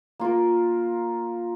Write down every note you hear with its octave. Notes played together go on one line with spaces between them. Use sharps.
A#3 F4 A#4